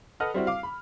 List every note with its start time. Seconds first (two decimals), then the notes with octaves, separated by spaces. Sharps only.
0.20 A4 B4 D#5 F#5 F6
0.34 G3 C4 E4 F#4
0.47 F5 D6
0.63 B5